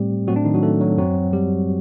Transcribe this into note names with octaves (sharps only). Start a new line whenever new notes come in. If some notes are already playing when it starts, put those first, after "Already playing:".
Already playing: A2 G3 A3 C4 G4
A2 F#3 A3 C4 F#4
D4
D#3 D#4
F#3 F#4
A3 A4
F#3 F#4
F#2 F#3 C4 F#4
G3 G4